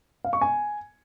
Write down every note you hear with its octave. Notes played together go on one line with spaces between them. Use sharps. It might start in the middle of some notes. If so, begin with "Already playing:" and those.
F5
C#6
G#5